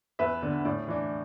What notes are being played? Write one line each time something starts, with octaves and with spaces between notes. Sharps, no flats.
E2 B4 E5
D3 B3 D4
A2 D5
E3 D4